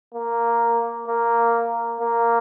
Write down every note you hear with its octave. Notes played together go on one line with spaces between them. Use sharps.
A#3
A#3
A#3